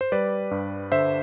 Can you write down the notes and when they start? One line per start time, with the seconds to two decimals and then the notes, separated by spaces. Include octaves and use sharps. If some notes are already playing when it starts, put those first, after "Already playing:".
0.01 C5
0.12 G3 B4 D5
0.51 G2
0.92 D3 C5 E5